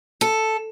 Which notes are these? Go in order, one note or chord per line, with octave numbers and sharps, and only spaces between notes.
A4